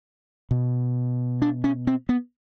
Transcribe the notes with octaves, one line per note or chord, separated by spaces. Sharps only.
B2
D4
C#4
C4
B3